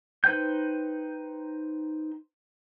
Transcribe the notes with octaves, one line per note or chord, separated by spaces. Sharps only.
D#4 B4 C5 G5 G6